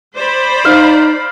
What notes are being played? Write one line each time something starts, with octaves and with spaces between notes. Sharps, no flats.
C5 D5 B5
D#4 F5